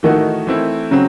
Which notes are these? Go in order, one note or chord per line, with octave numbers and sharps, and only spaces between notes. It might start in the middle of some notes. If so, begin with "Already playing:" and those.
D#3 E3 A3 D#4 F#4
E3 A3 C4 E4
C#3 F#3 C4